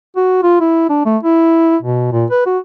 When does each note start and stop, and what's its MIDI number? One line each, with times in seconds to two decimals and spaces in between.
0.16 0.39 66
0.43 0.60 65
0.60 0.89 64
0.90 1.04 62
1.06 1.17 57
1.23 1.76 64
1.82 2.08 47
2.12 2.25 46
2.31 2.42 71
2.46 2.58 66